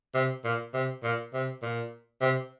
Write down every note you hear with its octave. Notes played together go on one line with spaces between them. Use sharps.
C3
A#2
C3
A#2
C3
A#2
C3